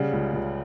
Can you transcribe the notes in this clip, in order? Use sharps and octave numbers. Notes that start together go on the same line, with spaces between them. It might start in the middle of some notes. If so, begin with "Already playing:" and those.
Already playing: C#3 G3 D5 F#5
C#2
C#2